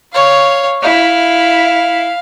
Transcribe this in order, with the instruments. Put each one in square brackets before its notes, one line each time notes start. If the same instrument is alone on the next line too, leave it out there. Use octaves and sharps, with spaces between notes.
[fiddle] C#5 F5
[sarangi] E4 [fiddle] F5